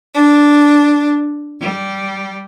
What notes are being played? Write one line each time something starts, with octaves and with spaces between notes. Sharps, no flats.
D4
G3